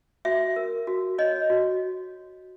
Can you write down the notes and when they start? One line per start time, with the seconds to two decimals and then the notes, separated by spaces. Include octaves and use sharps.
0.25 F#4 E5
0.56 A#4
0.87 F#4
1.18 C#5 D#5
1.50 F#4